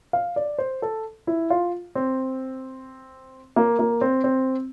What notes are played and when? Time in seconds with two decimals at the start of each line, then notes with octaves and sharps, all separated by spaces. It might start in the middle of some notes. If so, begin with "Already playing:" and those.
0.13 F5
0.36 D5
0.58 C5
0.82 A4
1.27 E4
1.50 F4
1.95 C4
3.56 A#3
3.79 A#3
4.01 C4
4.24 C4